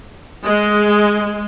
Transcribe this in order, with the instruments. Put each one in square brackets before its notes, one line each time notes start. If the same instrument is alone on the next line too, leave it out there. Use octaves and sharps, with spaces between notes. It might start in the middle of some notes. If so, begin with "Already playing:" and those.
[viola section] G#3